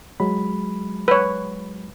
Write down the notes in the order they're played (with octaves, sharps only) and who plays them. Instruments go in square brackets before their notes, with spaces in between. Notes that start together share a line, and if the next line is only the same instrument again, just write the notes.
[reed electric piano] F#3 G#3 B5
[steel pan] B4 C#5